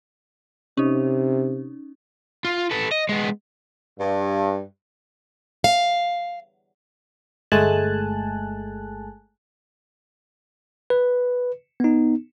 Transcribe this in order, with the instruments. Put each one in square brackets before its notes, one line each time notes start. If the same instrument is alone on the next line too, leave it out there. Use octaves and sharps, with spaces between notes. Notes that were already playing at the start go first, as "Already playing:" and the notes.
[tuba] C3 [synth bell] C#4 D#4
[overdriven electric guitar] F4
A4 B4
D#5
G#3 B3
[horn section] G2
[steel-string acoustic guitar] F5
[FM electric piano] G1 G#3 A3 G#5 A5 F#6
[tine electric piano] B4
B3 D#4